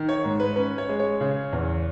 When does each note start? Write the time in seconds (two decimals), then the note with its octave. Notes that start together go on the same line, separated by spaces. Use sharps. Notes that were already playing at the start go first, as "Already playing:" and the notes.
Already playing: D#3
0.09 C#5
0.24 G#2
0.40 B4
0.56 C#4 B4
0.78 C#5
0.89 G#3
0.99 C#5
1.21 C#3
1.53 E2